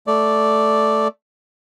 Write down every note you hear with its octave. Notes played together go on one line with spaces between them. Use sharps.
A3 D5